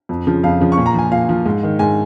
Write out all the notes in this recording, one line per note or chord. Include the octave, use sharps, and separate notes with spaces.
F2
C#3 F3
F2 F5
C#3 F3
C#6
A#2
A#5
F3 G#5
A#2 F5
F3
G#2
D#3
G#2 G#5